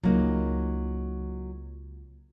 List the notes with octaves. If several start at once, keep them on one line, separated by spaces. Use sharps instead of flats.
C#2 F#3 A#3 D#4